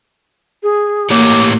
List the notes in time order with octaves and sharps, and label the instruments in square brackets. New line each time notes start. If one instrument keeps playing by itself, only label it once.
[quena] G#4
[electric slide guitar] A2 G4 C#5 [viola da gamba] A#3 [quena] D6